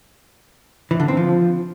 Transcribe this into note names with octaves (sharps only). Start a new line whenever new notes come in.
E3
D3
C4
F3